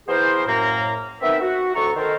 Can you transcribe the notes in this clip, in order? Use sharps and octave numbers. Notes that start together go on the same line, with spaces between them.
E3 B3 E4 G#4 A#4 C5
F#2 A2 A#3 A#5
B3 C4 D#4 A#4 E5
F#4
D2 A2 A4 A#5 C#6
D#3 A4 A#4 C5